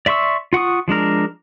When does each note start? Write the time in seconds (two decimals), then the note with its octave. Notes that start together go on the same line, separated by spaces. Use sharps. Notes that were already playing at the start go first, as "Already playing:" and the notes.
0.06 D5 E5 C6 C#6 E6
0.53 F4 F#5 C#6 D#6
0.88 F3 G#3 D4 A#4